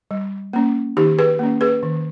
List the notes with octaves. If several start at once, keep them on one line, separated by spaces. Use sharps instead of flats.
G3
A#3 C#4
D#3 D#4 G4
G#4 B4
A#3 C#4
G#4 B4
D#3